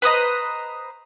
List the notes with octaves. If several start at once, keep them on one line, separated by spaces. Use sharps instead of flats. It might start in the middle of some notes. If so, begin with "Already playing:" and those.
B4 C5 D#5 A#5